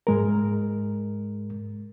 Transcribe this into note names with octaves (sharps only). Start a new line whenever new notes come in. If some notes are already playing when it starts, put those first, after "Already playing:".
G#2 G#3 A#4